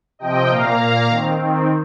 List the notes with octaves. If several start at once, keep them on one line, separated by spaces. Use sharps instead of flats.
C3 F3 C4 D#5 G5
A#2 A#3 F5 A#5
A#2 A#3
D#3 C4
D#3 C4